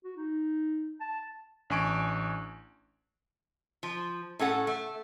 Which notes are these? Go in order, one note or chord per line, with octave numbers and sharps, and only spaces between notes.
F#4
D#4
A5
A1 D4 G#5 C#6 D7
F3
A2 C#4 A4 F#5
A3